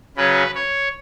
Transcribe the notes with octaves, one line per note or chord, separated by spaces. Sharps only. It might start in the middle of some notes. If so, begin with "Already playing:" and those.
C#3 F#3 C#4 B4
C#5